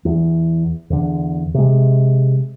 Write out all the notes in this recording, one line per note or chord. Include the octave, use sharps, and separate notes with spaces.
E2
E2 D3
C3 G#3